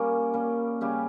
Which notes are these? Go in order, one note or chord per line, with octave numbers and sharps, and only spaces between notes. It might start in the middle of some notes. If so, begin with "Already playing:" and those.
Already playing: G3 A#3 C#4
G3 A#3 C#4
C#3 G3 C#4 G4